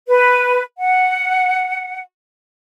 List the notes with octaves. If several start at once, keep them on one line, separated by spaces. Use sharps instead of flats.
B4
F#5